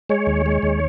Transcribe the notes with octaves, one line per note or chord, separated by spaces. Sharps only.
G#3 C#5
D#2
G#3
D#2